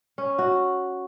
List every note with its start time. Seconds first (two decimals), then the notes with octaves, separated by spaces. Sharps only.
0.18 C#4
0.39 F#4